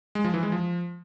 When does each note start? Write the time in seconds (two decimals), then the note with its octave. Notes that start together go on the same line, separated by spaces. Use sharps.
0.15 G#3
0.24 F3
0.34 E3
0.43 G#3
0.52 F3